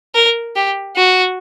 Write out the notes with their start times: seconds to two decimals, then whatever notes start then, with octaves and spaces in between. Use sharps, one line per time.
0.14 A#4
0.56 G4
0.97 F#4